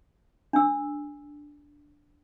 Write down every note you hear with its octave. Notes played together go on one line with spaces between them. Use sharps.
D4 E6